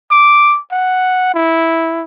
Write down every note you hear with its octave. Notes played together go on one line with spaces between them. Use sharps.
D6
F#5
E4